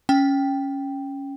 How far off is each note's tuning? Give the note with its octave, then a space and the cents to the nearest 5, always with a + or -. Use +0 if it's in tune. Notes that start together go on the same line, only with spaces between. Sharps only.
C#4 +0 G5 +0